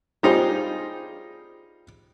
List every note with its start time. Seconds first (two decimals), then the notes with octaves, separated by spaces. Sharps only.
0.23 G3 D#4 F4 G4 G#4 C5